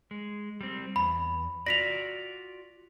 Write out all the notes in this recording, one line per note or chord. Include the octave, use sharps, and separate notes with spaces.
G#3
G3 C4
E2 B5
F4 F#4 D5 A#6 B6 F7